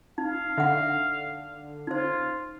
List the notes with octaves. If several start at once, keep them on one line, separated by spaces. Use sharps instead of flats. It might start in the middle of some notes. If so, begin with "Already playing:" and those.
D#4 F5
D3 E5 F#5
D#4 F4 C5